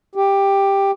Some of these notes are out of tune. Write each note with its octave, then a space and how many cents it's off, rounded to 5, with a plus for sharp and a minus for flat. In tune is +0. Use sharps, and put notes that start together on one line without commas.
G4 +10